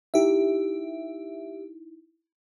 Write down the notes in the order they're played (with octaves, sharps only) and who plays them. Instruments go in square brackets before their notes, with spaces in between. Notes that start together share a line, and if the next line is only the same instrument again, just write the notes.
[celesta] D#4 E4 [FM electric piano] G4 E5